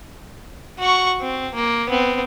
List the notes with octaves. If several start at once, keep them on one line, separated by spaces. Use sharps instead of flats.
F#4 C#6
C4
A#3
B3 C4